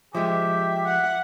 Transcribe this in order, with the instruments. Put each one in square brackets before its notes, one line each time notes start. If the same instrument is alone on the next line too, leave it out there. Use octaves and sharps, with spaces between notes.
[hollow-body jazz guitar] F3 G#3 [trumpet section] G4 [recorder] E5
[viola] F#5